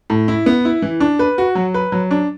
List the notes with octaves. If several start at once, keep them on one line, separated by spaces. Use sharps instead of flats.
A2
E4
B3
E4
E3
D4
B4
F#4
F#3
B4
F#3
D4